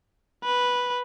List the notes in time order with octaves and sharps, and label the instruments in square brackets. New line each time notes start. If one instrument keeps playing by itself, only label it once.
[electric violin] B4